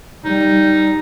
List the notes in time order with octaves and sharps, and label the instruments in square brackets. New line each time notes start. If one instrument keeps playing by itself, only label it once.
[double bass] G3 [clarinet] D#4